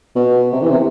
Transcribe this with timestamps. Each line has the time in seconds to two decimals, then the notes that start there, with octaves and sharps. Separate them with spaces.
0.15 B2
0.52 C3
0.61 E3
0.70 C3